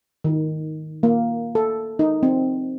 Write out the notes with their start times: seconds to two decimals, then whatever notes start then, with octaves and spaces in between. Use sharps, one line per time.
0.24 D#3
1.03 A#3
1.55 A4
1.99 D#4
2.23 C4